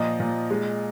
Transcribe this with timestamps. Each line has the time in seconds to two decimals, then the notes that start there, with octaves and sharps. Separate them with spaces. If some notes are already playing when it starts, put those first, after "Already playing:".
Already playing: A#2 F3 D#5
0.20 A#2
0.50 G#3